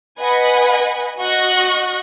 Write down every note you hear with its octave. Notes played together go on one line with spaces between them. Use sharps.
B4 D#5 F#5 G#5 B5
F#4 D#5 F#5 C#6 F#6 A#6